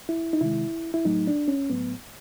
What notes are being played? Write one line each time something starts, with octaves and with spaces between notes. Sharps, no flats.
E4
D#4
C3 D#3 G#3 E4
E4
A2 F#3 A3 D#4
D4
C#4
A2 F#3 A3 B3